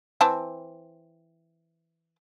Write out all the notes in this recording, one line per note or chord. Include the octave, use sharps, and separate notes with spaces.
E3 C4 A5